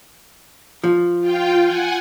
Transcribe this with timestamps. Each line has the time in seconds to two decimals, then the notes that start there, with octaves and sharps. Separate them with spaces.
0.84 F3
1.20 F4 G5
1.63 F#5 G#5